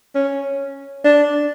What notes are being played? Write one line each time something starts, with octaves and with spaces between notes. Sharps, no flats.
C#4
D4